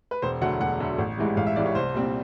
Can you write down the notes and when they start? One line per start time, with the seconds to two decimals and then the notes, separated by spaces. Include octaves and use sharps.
0.11 B4
0.22 E1 C5
0.41 D2 D3 F#3 A3 F#5
0.61 E1 F#5
0.80 D2 D3 F#3 A3
0.99 A1
1.18 G#2 E3 G3
1.37 A1 F5
1.47 E5
1.56 G#2 E3 G3 D5
1.66 C#5
1.75 C2 C5
1.94 A#2 G3 C4